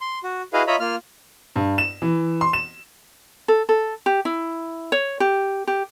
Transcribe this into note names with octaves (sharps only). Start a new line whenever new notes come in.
C6
F#4
E4 F#4 G#4 B4 D#5 F5
F4 C#5 D#5 E5 A#5 B5
A#3 F4 F6
G2
E7
E3
C6
E7
A4
A4
G4
E4
C#5
G4
G4